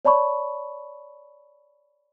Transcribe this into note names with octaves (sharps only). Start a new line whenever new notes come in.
C#5 D5 A5 B5 C#6